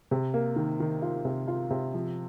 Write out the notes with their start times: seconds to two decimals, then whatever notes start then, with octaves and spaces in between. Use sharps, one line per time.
0.11 C3
0.34 A#3
0.56 D#3
0.80 D#3
1.02 F4
1.25 C3
1.48 F4
1.71 C3
1.94 F3